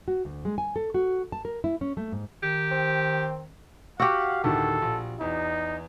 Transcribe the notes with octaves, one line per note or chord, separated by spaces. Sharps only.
F#4
D2
G#3
G#5
A4
F#4
A5
A#4
E4
C#4
A3
G#2
D#3 G4
C4
F#4 G4 F5 F#5 E6
D2 A2 D#3 A4
A#1
E2 D#4